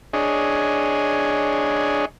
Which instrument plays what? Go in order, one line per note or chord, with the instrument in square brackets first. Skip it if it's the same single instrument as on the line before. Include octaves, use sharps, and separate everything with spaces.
[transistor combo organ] D4 G#4 C#5 D#5